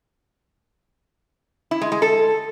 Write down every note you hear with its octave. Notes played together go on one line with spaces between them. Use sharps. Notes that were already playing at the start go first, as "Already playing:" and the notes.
E4
G#3
G#3
A4